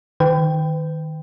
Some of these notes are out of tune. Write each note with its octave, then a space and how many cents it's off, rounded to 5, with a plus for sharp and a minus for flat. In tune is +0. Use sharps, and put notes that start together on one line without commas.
D#3 +0 B4 +40 G5 +0